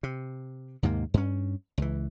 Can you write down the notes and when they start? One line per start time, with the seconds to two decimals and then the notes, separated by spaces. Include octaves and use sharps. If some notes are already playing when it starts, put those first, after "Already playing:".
0.03 C3
0.83 D#2 G#2 C3 A#3
1.14 G2 C#4
1.78 C#2 E3